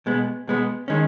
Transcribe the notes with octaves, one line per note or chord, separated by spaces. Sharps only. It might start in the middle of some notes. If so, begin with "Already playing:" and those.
B2 G#3 B3
B2 G#3 B3
D#3 G#3 C#4